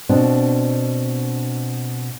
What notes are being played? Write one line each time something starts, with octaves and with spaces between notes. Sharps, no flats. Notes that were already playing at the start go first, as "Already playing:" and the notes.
B2 C4 D4